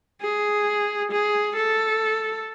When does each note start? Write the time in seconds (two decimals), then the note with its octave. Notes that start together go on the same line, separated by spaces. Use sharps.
0.22 G#4
1.12 G#4
1.57 A4